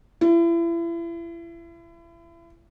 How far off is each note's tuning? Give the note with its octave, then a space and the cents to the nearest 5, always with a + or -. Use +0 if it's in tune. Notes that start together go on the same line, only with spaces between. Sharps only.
E4 +35